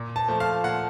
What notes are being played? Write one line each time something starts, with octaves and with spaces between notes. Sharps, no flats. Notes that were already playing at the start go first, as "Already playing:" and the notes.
Already playing: A#2
A5
F3 A3
F5
A#2 F#5